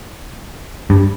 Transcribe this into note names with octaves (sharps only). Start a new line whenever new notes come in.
G2